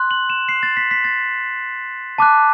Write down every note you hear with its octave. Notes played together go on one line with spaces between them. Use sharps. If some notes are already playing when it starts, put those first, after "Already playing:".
Already playing: C6 F#6
F#7
E7
C7
A6
B6
B6
A6
A5 D6 F#6